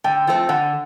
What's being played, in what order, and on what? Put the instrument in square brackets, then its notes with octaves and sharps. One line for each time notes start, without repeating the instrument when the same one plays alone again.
[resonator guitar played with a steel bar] D3 [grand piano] G5
[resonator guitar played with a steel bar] F3 A3 C4
[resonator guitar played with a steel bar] D3 [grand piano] F#5